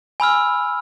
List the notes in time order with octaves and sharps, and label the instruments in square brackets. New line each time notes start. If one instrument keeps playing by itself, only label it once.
[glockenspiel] G#5 B5 E6 F6